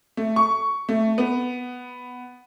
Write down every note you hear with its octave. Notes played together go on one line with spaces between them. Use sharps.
A3
C#6
A3
B3